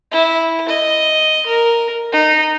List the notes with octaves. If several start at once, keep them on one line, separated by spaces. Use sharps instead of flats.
E4
D#5
A#4
D#4